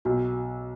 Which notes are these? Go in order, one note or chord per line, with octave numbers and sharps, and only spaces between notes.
B1 F#4